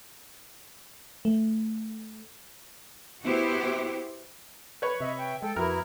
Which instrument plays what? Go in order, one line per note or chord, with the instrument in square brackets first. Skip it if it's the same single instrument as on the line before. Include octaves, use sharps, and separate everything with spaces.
[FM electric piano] A3
[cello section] B3 E4 F#4 G4 C5
[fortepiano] B4 C#5
[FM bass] C3 [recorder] D#5 [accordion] E5
[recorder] G5
[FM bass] G#3 [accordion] A4 [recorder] G5
[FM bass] F2 [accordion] B3 E4 [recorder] F#4 [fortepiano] A#4